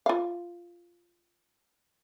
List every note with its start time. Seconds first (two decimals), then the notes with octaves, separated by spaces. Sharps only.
0.06 F4 F5